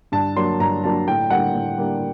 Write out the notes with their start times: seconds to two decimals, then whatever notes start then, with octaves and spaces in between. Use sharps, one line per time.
0.12 G2 A5
0.36 F#3 A#3 D4 C6
0.60 G2 A#5
0.84 F#3 A#3 D4 A5
1.08 A2 G5
1.30 G3 A#3 D4 F#5
1.55 A2
1.78 G3 A#3 D4